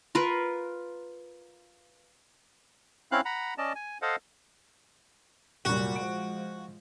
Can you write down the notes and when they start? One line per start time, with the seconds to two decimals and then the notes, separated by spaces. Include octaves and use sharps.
0.15 F4 A#4 B4
3.12 C4 C#4 E4 F5 F#6
3.25 F#5 A#5 B5
3.58 C#4 D5 D#5 A5
3.75 G#5
4.02 A4 C5 D#5 F5 F#5
5.65 F1 A#2 F#3 G3 F#4
5.96 F3 G#3 D7